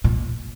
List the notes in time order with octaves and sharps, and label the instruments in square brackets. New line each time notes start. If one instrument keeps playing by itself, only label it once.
[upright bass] A#2